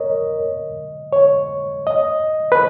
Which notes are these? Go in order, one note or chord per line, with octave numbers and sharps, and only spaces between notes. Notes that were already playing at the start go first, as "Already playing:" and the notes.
Already playing: A#4 C#5 D#5
C#5
D#5
B4